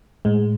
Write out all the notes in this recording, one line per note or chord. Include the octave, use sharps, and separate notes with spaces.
A2 G#3